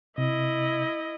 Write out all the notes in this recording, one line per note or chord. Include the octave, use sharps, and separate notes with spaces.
C3 E4 D#5